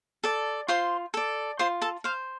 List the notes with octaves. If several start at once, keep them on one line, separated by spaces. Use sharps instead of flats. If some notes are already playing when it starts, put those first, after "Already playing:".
A4 D5
F4 C5 C6
A4 D5
F4 C5 C6
A4 A5
C5 F5